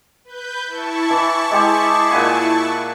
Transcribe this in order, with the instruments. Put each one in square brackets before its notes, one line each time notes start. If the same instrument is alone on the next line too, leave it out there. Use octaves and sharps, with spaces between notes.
[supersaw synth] B4 G6
E4 A5 C#6
[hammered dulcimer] E3
G#3 G4 G#4
A#2 F#5 G#5